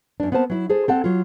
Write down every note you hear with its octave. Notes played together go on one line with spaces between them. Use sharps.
F#2 D4
B3 C4 A#4 C5 A5
F#3 E4
G#4 A4 C5
C4 A4 F#5
F#3 F4